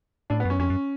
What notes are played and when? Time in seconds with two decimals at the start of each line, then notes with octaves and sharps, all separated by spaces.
0.30 A2 D4
0.40 B3
0.45 F#2 C#4
0.59 F2 C#4
0.70 F#2